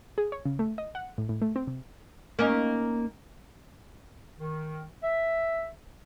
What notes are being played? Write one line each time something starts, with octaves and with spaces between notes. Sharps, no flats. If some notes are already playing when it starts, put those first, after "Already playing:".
G#4
C#5
C#3
A3
D#5
F#5
A2
A2
A3
C4
C3
A#3 C#4 D#4
D#3
E5